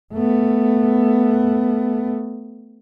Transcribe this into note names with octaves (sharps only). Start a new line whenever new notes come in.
A3 B3